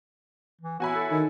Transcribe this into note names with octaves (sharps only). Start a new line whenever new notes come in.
E3
B3 E4 F#4 C#5 G#5 B5
A4
D#3